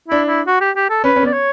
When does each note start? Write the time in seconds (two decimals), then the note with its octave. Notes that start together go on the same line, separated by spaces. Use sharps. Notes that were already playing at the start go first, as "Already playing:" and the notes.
0.08 D4 E4
0.27 E4
0.47 F#4
0.61 G4
0.76 G4
0.90 A4
1.04 C#4 B4
1.16 C#4
1.23 B3
1.26 D5
1.33 C#5